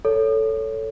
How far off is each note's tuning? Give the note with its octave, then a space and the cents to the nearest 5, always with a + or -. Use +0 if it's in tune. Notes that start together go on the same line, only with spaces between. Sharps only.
A4 +5 C#5 +10